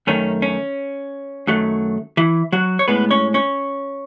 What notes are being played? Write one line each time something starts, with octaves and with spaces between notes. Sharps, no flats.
F#2 D#3 A3 C#4
C#4
F#2 D#3 F#3 A3
E3 E4
F#3 F#4
C#5
A2 G#3 B3 B4
C#4 C#5
C#4 C#5